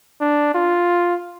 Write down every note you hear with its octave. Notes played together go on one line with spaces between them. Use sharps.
D4
F4